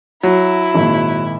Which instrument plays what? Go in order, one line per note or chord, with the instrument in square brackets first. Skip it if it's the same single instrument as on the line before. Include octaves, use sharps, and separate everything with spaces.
[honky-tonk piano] F#3 [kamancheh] E4
[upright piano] G#1 A#2